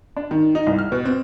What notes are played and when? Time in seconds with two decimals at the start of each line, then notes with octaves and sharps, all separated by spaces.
0.16 D4
0.31 D#3
0.55 D#4
0.67 C2
0.79 F6
0.92 B2
1.05 C4